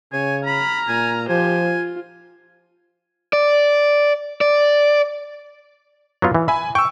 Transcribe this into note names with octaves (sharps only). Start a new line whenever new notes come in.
C#3 C#5 G#5
A#5 B5 F6
A#2 G#5
F3 G4 C5 G#5
F4
D5
D5
F#3 B3 F4
E3
E5 G#5 B5
G5 C#6 E6